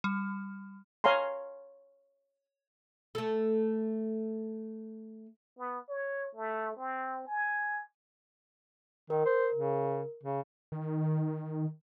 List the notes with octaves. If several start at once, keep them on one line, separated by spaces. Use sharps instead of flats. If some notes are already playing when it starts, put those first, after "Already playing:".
G3
C#5 F5 G#5 A#5 C6
A3 A4
B3
C#5
A3
C4
G#5
D#3 A#4
C5
C#3
C#3
D#3